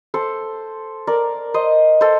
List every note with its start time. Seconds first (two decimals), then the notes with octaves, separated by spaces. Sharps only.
0.14 A4 C5
1.07 A#4 D5
1.54 C5 D#5
2.01 A4 C5